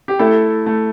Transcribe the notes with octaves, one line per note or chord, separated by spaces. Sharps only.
G4
A3 E4 A4
A3